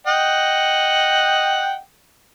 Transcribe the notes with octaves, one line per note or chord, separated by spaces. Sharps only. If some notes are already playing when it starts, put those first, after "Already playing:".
D#5 F#5 G5